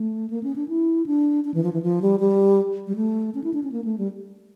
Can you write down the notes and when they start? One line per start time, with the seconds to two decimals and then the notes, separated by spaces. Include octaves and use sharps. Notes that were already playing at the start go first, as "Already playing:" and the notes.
Already playing: A3
0.30 A#3
0.43 C#4
0.56 D4
0.68 E4
1.06 D4
1.45 D4
1.54 E3
1.63 F3
1.73 E3
1.83 F3
2.02 G3
2.20 G3
2.87 G3
2.96 A3
3.35 C#4
3.44 E4
3.54 D4
3.63 C#4
3.72 A#3
3.84 A3
3.98 G3